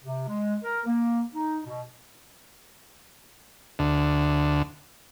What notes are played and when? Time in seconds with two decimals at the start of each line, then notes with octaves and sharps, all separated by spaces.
0.04 C3
0.28 G#3
0.64 A#4
0.86 A#3
1.32 D#4
1.65 B2
3.79 D2